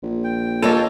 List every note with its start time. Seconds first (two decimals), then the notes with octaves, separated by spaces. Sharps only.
0.03 A#1
0.24 G5
0.63 A#3 F4 A4 C#5 D#5